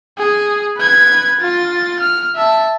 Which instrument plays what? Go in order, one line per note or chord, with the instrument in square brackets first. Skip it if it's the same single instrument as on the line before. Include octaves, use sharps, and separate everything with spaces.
[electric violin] G#4
B4 G#6
F4 A6
F6
E5 A5